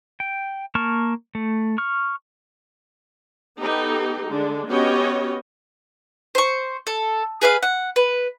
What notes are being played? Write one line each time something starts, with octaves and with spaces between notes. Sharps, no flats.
G5
A#3 A5 C#6 F6
A3
C#6 F6
B3 D#4 G4 A4
D3 G#3 D4
B3 C#4 F#4 G4 C#5 D#5
C5 C#6
A4
G#4 B4 E5 F5
F#5
B4